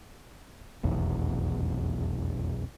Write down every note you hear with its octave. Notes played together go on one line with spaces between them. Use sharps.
F1 B1 E2